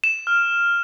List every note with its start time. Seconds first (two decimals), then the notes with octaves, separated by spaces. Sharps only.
0.04 E7
0.27 F6